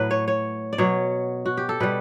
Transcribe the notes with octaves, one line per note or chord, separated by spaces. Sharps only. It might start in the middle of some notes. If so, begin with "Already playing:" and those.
Already playing: A2 F#3 B4
C#5
C#5
D5
B2 F#3 C#5
F#4
G4
A4
B2 G3 B4